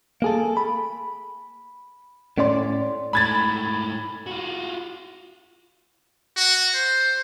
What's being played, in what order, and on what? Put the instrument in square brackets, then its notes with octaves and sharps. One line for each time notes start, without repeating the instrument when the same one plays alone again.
[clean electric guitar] A#3 G#4 A4
B5
A2 C#4 C#5 D5 C6
[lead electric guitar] G#2 A3 [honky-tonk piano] B5 G#6 A6
[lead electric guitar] F4 F#4
[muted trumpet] F#4
C5